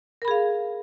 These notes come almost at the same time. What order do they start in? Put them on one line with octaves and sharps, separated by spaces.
A#4 B5 G#4 F5